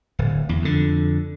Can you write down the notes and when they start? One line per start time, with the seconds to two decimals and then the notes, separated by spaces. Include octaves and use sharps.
0.19 D1
0.49 E2
0.62 F2 D3